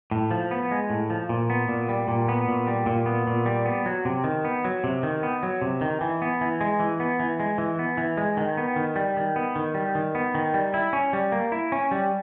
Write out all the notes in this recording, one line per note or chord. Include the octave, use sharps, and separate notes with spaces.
A2
F3
B3
G#3
A2
F3
A#2
B3
A#2
G3
A#2
B3
A#2
G3
A#2
B3
A#2
G3
B3
F#3
C3
D#3
B3
F#3
C3
D#3
B3
F#3
C3
D#3
E3
B3
E3
G#3
E3
B3
E3
G#3
E3
B3
E3
G#3
D#3
B3
D#3
G3
D#3
B3
D#3
G3
D#3
B3
D#3
G3
E4
C#4
G3
A#3
E4
C#4
G3